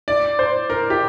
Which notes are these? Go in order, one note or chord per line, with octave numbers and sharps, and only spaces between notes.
D5
C5
A#4
G4